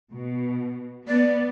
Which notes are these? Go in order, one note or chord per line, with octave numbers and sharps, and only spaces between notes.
B2
B3 D5